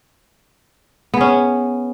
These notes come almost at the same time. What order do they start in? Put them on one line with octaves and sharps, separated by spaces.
B3 G#4 C#4